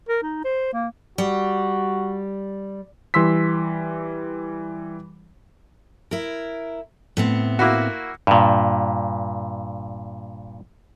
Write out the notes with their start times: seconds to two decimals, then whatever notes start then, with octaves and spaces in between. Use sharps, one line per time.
0.09 A#4
0.22 D#4
0.44 C5
0.73 A#3
1.18 G3 F#4
3.14 E3 G3 C6 E6 B6
6.11 E4 A#4
7.17 A2 B3 C4
7.59 A#3 E4 F#4
8.27 G2 A#2